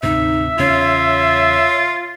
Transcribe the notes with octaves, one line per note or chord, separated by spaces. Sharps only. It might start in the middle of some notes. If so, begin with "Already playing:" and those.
D2 G#2 C3 D#4 E5
E2 C#3 C#4 F4 C#5